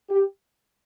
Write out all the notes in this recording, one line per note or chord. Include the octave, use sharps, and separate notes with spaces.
G4